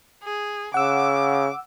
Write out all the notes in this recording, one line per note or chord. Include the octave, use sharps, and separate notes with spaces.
G#4
C#3 F#5 D6 E6